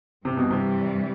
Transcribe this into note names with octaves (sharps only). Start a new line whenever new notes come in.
G2 C3 E3 G3
B2
C3